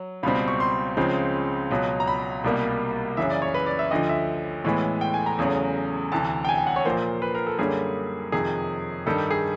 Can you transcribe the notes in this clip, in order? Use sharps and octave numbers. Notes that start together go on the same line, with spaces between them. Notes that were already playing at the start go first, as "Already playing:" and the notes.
Already playing: F#3
C#2 B2 G3 C4 B5
B5
C#6
C6
C#2 C#3 F3 G#3 C4
C#2 B2 F#3
A#5
B5
C2 B2 G3 A#3
F#2 C#3 E3 E5
D5
C#5
B4
D5
E5
D2 D3 F3 D#5
E5
A2 E3 G#3 B3
G5
G#5
A#5
E2 C#3 F#3 A3
D2 C3 E3 A5
G5
G#5
G5
F#5
C#5
A#2 F3 A#3 C5
B4
A#4
A4
F#2 D3 G3 A#3 G#4
F2 C3 D#3 G#4
G2 D#3 G3 A4
G#4